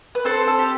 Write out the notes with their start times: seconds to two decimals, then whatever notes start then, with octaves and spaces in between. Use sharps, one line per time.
0.15 B4
0.25 C4 A4 C5
0.48 A4
0.59 G4